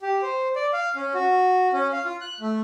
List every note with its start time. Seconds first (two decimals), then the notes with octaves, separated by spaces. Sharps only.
0.02 G4
0.22 C5
0.56 D5
0.73 F5
0.96 C#4
1.14 F#4
1.73 C#4
1.93 F5
2.05 F4
2.21 F#6
2.40 A3